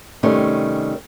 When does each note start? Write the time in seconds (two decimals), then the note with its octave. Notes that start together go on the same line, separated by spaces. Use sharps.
0.23 C3 D#3 G3 A3 C#4